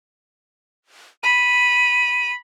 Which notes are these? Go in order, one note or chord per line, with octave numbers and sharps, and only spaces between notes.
B5 D#7